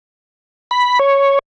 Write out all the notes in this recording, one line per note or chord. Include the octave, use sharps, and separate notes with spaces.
B5
C#5